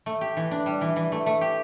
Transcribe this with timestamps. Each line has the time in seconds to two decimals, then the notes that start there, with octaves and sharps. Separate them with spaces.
0.06 A3
0.21 G4
0.37 E3
0.51 D4
0.66 G3
0.81 E3
0.96 E3
1.12 A3
1.26 A3
1.41 G4